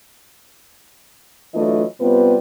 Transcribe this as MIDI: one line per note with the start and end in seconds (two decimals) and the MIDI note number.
1.54 1.84 52
1.54 1.84 54
1.54 1.84 57
1.54 1.84 62
1.54 1.84 65
1.54 1.84 75
2.01 2.37 48
2.01 2.37 55
2.01 2.37 59
2.01 2.37 60
2.01 2.37 65
2.01 2.37 71